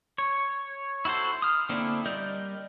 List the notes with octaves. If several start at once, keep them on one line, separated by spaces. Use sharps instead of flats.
C#5
E4 F#4 A4 C5
D#6 F6
D3 A#3 C4 D4 E4
G3 A#4 D5 D#5 G6